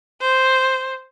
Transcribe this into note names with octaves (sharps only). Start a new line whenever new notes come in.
C5